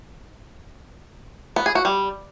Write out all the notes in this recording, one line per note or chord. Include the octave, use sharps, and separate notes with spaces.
B3
G#4
F#4
G3